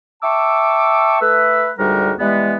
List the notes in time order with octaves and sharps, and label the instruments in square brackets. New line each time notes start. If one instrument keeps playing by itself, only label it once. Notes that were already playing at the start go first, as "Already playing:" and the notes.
[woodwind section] E5 G5 A5 C#6 D6 E6
A3 B4 E6
D2 G#2 G3 F#4 G4 A#4
E3 G3 G#3 B3